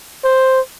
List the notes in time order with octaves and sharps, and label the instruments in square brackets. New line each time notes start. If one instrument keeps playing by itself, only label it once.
[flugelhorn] C5